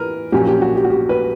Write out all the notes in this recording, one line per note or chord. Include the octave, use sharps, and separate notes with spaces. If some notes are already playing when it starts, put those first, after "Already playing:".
Already playing: E3 A#4 B4
A#1 A#2 F#3 C#4 G4
G4
F#4
G4
F#4
G4
B4